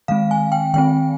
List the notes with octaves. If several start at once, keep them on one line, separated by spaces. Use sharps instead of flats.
D#3 G#3 C4 F5
G#5
G5
D#3 G#3 C4 G5